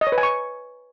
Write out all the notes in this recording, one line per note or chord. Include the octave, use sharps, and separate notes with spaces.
D#5
C#5
B4
G#5
C#6